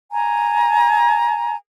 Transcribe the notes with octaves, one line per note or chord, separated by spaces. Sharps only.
G#5 A#5